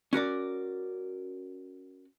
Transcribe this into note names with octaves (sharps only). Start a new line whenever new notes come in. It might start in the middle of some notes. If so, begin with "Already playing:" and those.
C#4 F#4 A#4 D5